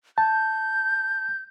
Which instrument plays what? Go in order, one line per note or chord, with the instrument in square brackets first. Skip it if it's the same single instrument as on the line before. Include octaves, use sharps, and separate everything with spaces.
[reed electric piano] A5 [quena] G6